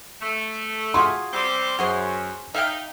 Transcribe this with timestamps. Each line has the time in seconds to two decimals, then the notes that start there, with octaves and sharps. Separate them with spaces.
0.22 A3
0.94 F4 F#4 G#4 C6
1.33 G3 C4 G4
1.79 F#2 F#4 G#4 C5
2.54 D#4 E5 F5 G5